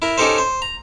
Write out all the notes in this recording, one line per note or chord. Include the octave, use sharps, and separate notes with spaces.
E4 A#4
C#4 D#4 G4 A4 A#4 C5
C5
A#5